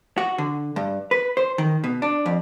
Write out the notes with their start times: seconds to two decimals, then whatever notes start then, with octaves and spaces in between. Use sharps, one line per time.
0.18 F#4
0.38 D3
0.76 G2
1.11 B4
1.37 C5
1.58 D#3
1.84 B2
2.02 D4
2.26 F2